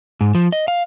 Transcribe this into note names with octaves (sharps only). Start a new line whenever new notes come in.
G#2
F3
D#5
F5